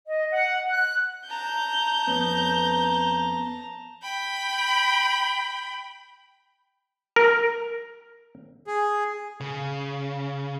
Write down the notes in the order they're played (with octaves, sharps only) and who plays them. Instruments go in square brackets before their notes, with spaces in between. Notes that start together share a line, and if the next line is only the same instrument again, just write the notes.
[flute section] D#5
F#5
F#6
[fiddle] A5 A#5 [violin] G6
[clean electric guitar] F2 B3 C#4
[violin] G5 B5
[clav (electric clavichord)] A#4
[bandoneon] G#4
[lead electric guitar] C#3